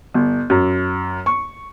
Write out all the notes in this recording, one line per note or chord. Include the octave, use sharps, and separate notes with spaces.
G1
F#2
C#6